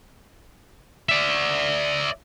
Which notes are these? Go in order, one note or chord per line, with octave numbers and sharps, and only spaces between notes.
D5 E5